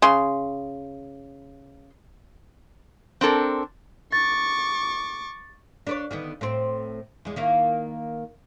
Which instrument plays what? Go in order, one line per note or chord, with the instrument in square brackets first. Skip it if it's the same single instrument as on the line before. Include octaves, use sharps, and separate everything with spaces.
[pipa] C#3 C6
[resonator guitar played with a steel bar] C4 D4 A4 A#4
[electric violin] C#6 D6 [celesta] A6
[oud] D4 B4 C#5
D3 D#3 B3
A2 C4
E2 G#3
D#3 A#3 E4